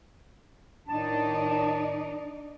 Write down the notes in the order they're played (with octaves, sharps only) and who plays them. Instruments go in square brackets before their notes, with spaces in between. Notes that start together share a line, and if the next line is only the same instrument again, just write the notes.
[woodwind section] A2 D#3 A5 [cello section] D4 D#4 D5